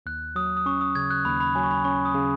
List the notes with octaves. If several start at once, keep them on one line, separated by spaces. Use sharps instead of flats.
D#2 F#6
F#3 D#6
D#6
C#4 C#6
D#6
C#3 G#6
F#6
D#2 B5
B5
F#3 G#5
C#6
B5
C#4 C#6
D#6
C#3